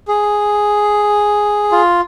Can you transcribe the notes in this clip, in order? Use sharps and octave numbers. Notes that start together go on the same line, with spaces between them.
G#4
F4